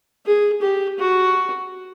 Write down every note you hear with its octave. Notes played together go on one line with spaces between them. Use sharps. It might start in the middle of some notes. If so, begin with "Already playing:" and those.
G#4
G4
F#4